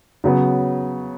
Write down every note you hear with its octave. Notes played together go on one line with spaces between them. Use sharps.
C#3 F#3 B3